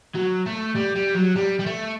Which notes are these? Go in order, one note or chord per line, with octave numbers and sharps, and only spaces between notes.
F#3
A3
G3
G3
F#3
G3
G3
A3